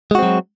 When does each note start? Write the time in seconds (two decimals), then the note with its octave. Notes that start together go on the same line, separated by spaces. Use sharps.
0.11 G#3
0.15 F#4
0.19 C4
0.23 F#3